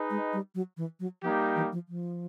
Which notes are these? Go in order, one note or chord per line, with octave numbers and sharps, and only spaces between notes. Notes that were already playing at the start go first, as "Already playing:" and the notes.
Already playing: D#4 G#4 B4 D#5
G#3
G3
F#3
E3
F#3
F3 G3 A#3 D#4 G4
E3
F3
F3